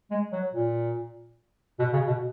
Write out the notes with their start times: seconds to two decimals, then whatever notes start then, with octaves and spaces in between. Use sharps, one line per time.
0.11 G#3
0.32 F#3
0.54 A#2
1.79 B2
1.93 C#3
2.07 B2